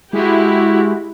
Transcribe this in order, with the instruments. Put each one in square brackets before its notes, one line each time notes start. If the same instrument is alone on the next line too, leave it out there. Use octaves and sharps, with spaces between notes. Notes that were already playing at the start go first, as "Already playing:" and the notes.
[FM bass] G#3 [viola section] E4 G4 [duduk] F#4